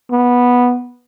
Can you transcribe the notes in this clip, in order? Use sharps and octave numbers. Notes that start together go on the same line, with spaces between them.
B3